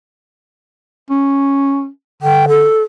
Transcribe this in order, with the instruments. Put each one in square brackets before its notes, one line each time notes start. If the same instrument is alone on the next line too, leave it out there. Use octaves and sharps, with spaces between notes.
[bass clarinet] C#4
[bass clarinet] D3 [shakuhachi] G5
[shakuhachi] A4